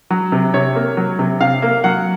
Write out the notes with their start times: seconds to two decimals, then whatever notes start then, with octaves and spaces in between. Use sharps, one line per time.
0.10 F#3
0.32 C3
0.54 C3 C#5
0.75 A#3
0.97 F#3
1.19 C3
1.40 C3 F5
1.62 A#3
1.84 F#3 F#5